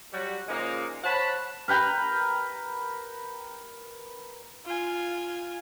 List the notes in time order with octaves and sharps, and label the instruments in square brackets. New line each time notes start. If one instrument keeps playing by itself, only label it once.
[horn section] F#3 G3 F#4
A#2 C#3 F3 G#3 A#3 D#4
C5 C#5 F#5 A5 B5
[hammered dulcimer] A#4 B4 G5 A#5
[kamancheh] F4 G#5